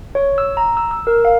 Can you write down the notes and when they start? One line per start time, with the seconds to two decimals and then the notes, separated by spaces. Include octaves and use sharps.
0.15 C#5
0.38 E6
0.57 A#5
0.77 E6
0.91 E6
1.07 A#4
1.25 F5